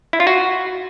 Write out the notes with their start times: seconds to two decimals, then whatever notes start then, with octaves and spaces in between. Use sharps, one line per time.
0.13 E4
0.20 F4
0.27 F#4